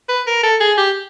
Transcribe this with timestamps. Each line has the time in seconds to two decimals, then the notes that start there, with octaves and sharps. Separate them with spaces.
0.09 B4
0.27 A#4
0.43 A4
0.60 G#4
0.77 G4